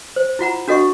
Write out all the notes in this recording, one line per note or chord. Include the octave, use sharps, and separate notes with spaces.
C5
E4 F4 F#5 A#5
D4 F#4 A4 D#5 F#5 C#6